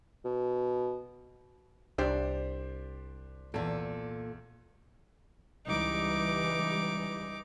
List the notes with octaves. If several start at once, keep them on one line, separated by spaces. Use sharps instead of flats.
B2
C2 D4 G4 C5 D5
E2 A#2 A4
C#2 E3 G3 D#4 D6